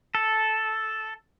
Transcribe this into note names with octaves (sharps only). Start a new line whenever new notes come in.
A4